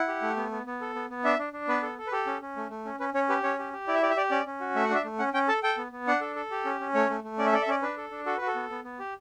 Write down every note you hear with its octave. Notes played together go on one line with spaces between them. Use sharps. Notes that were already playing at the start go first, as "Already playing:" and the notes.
Already playing: E4 F#5
G4
A3
B3
B3
B3
A4
B3
B3
D4 E5
D4
D4
B3 B4
A4
A4
B4
G4 A4
C#4
C#4
A3
A3
C#4
C#4 B4
C#4 C#5
G4 B4
C#4 C#5
G4
G4
E4 D5
E5
G4 D5
E5
G4 D5
C#4 D5
C#4
F#4
A3 E5
F#5
D4 E5
A3
C#4 F#5
C#4 G5
A4 A5
A4 G5
B3
B3
D4 F#5
A4
A4
G4
C#4
C#4
A3 C#5
A3
A3
C#4 D5
E5
A4 D5
E5
C#4 D5
D4 B4
A4
D4
F#4 A4
F#4 B4
A4
B3
B3
B3
G4